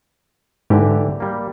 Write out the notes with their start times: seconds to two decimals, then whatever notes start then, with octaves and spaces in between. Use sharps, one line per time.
0.70 G#2 D3 E3 G4
1.20 G3 A#3